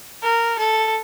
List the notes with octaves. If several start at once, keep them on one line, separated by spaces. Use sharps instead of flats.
A#4
A4